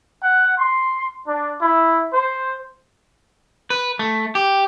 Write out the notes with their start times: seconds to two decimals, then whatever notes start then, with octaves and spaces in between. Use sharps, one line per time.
0.22 F#5
0.57 C6
1.26 D4
1.60 E4
2.11 C5
3.70 B4
3.99 A3
4.35 G4